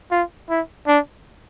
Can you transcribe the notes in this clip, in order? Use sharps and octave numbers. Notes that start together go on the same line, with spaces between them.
F4
E4
D4